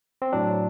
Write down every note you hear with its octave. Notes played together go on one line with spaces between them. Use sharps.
C4
A2 F#3 D4